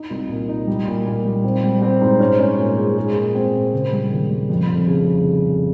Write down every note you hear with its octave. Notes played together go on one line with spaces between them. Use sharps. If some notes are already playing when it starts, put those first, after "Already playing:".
Already playing: D#4
C2
A#2
D#4
G3
A#2
A#2
G3
C4
G3
C4
G#2
C#4
C#4
A#2
G#3
G#3
A#2
C4
A#2
C#3
G3
D#2
G3
F2
F1
C#3